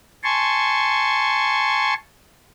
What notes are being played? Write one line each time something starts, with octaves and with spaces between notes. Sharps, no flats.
G#5 A5 C6 C#6